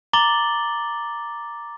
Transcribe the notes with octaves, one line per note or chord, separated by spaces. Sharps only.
A#5 D6 A6 F#7 G7